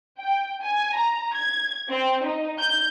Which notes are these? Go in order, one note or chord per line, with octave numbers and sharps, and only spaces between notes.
G5
G#5
A#5
G#6
C4
D#4
G6